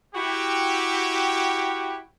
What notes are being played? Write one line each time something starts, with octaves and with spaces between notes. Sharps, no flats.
E4 F#4 G4